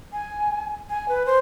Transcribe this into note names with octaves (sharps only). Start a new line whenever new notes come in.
G#5
G#5
B4
C5